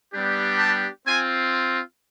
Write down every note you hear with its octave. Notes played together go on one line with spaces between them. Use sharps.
G3 B3 D4 G4
A5
C4 F4 G#5